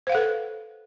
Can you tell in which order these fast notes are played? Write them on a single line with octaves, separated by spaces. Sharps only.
C5 F5 F#5 A4 B4